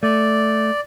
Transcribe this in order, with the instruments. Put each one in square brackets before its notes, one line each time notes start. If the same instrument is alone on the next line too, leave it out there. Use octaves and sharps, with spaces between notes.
[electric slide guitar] A3 [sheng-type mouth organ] D5